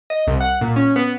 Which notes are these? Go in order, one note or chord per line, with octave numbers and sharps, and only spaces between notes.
D#5
C2
F#5
A#2
C#4
B3